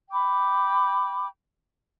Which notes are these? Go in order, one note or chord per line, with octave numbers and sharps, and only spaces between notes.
G5 B5 D6